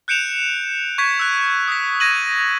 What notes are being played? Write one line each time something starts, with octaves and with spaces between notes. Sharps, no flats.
F#6 G6 C#7 D7 E7 F7
C#6 G#6 B6
E6 F#6
D#6 B6
G#6 A#6 D#7 F#7